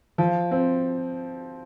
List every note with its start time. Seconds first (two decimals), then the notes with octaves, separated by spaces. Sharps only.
0.18 F3
0.51 C4